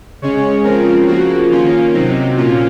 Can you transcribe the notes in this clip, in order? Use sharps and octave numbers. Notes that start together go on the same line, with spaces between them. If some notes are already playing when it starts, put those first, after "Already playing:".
C#3 G#3 C#4 C#5
C#3 F3 C4 A#4
C#3 F3 A#3 F#4
D#3 A#3 C#4 F4
C3 F#3 C4 D#4
A#2 F3 A#3 C#4 F4